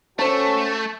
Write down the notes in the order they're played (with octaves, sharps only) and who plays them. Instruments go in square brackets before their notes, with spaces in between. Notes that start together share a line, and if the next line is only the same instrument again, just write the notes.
[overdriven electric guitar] A3 [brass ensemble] C#4 F#4 A4 [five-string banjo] C5 A5 [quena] C#6